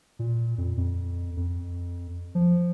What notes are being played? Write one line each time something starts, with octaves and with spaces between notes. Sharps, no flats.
A#2
F2
F2
F2
F3